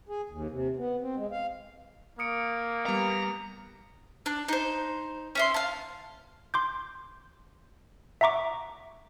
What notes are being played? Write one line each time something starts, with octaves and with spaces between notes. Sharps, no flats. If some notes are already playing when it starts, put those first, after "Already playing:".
G#4
D#2
C3
B3
C4
G#3
F5
A#3 D#6 C#7 D7
G3 B3 A#5
D4
D#4 C5
C#4 E5 C6
F5 A5
C6 D6 G6
E5 F#5 A#5 C#6 D6